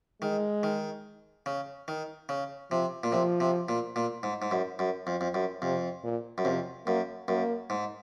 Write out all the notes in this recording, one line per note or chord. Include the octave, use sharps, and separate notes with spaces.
D#3 G#3
D#3
C#3
D#3
C#3
C3 F3
A#2
C3 F3
C3
A#2
A#2
G#2
G#2
F#2
F#2
F2
F2
F#2
F2 C3
A#2
F#2
F2 C3
F#2 A#3
F#2 A#3
G#2